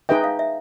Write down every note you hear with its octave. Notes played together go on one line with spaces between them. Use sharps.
D#4 G#4 B4 D#5 E5 G5
F5
E5